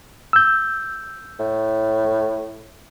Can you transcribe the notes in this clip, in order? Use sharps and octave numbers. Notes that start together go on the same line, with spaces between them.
E6 G6
A2